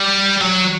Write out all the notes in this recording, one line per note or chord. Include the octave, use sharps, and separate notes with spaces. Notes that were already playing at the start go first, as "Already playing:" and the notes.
Already playing: G3
F#3